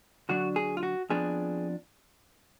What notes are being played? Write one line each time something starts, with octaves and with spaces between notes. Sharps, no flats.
D3 F#3 D4 F#4
G#4
F4
F#4
F2 F3 B3 D4 G#4